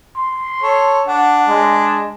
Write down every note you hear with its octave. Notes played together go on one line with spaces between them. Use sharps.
C6
A4 C#5
D4 F#5
G#3